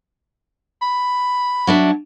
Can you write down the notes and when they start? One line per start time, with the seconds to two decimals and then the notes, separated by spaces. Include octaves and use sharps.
0.82 B5
1.67 F#3 D4 E5